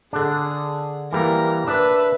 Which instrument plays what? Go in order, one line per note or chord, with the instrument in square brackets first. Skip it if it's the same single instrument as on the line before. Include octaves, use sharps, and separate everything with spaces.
[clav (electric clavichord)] D3 D4 [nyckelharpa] G#4
[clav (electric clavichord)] E3 G3 A#3 [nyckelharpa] A#4
[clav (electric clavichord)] D4 [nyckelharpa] B4 E5